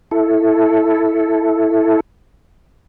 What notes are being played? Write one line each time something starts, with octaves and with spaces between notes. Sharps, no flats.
E4 A4